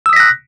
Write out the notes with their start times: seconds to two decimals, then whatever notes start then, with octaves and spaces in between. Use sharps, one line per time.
0.06 E6
0.09 D#6
0.13 B6
0.16 A#6
0.20 F#6